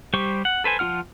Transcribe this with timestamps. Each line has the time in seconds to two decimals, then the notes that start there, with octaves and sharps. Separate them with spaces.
0.13 G3 G4 C5 C#6
0.45 F#5
0.64 A4 B4 C5 G#5
0.79 F3 D4 F4 F#5 F6